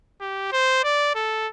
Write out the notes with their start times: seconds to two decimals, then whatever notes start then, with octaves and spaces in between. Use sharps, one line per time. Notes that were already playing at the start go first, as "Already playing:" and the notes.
0.21 G4
0.52 C5
0.83 D5
1.15 A4